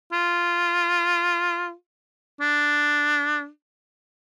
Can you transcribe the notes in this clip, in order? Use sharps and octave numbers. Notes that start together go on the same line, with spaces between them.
F4
D4